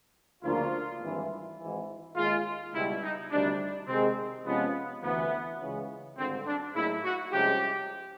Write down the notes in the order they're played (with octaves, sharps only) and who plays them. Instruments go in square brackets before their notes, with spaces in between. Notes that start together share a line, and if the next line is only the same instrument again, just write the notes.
[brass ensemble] D2 C#3 F3 A#3 D4 [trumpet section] F4
[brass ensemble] G#1 G2 E3
G#1 G#2 E3
[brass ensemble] D#2 D#3 G#3 [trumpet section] F4
[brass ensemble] C#2 B2 G3 [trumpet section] E4
[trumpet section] D#4
[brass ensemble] D2 C3 D#3 G3 [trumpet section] D4
[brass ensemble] C3 D#3 G#3 [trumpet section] C4
[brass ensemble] C3 F3 G#3 C#4 F4 [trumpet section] B3
[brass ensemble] D2 C3 E3 [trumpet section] B3
[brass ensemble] C#2 C#3 E3 G#3 C#4
[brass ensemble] G#1 G2 D3 [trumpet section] C4
[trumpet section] D4
[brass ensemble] A2 F#3 A#3 D#4 G#4 [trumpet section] E4
[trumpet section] F#4
[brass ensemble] C2 C3 F3 G#3 C#4 [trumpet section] G4